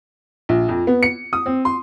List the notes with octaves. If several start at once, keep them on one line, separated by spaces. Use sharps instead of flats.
A#1
F2
B3
C#7
D#6
C4
C6